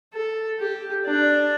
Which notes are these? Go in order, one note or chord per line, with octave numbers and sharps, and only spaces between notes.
A4
G4
D4